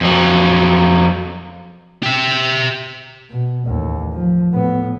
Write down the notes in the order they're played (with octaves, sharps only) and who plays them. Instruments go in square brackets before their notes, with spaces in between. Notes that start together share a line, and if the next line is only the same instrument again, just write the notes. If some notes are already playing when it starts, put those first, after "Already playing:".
[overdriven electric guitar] F2 F#3
[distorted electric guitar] G4 E5
[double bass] B2
A1 D#2
F3
A2 B3